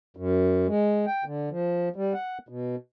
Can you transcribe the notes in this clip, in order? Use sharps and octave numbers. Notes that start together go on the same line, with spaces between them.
F#2
G#3
G5
D3
F3
G3
F#5
B2